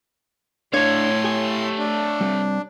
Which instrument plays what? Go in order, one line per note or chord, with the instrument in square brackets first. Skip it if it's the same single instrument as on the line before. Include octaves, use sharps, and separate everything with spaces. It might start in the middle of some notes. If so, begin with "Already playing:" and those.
[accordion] A2 C6 [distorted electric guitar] A3 F5 [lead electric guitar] D4 [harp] C#5
[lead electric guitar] G4 G#5
[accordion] D4
[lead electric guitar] G3 C4